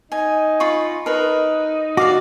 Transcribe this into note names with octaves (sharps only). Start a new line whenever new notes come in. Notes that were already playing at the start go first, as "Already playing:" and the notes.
D#4 G#5
F4 B5 C#6
D#4 A#4 B4
F#4 D5 F5 D6